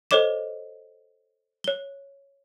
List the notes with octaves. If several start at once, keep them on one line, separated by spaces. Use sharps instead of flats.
A4 C5 C#5 D#5 D6 E7
C#5 G7